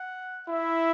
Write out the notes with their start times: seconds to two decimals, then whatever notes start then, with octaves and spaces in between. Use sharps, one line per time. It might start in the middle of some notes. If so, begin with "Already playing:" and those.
Already playing: F#5
0.48 E4 E5